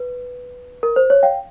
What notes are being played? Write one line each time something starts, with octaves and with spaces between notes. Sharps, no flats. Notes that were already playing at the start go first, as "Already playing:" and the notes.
Already playing: B4
A#4
C5
C#5
F5 G5